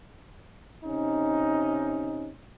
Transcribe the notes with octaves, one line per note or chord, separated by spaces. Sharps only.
C3 C#4 D#4